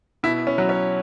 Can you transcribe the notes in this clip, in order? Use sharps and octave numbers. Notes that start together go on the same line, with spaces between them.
B2 E4
C#4
F#3
C#4